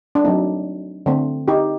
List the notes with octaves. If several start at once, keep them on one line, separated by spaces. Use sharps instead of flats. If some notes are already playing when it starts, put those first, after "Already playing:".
D4
F#3 A3 C4 D#4
D3 A3 C4
D#4 G4